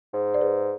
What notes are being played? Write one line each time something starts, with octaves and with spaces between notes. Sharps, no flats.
G#2
D5
G#4 B4